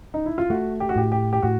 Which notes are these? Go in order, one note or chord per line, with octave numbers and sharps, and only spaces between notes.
D#4
E4
F4
A3 F#4
G4
F#4
A2 G4
G4
G4
A2 F#4